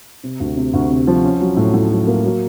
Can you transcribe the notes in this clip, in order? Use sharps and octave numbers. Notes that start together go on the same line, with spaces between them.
C3
D2
C3
D2
C3
F3
C#4
F#3
A2
A2
F#3
A#3
F#3